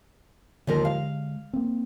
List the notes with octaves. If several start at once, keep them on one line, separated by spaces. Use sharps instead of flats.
D#2 D3 F3 G#3 A#4
F5
A#3 C4